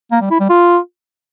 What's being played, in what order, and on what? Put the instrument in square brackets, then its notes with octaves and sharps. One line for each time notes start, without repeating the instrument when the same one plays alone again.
[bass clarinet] A#3
G3
E4
G3
F4